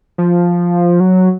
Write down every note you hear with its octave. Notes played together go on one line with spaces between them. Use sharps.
F3
F#3